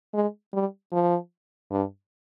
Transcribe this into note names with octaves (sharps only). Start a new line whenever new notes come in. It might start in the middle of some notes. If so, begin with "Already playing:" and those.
G#3
G3
F3
G2